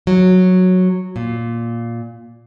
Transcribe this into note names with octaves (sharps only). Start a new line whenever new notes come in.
F#3
A#2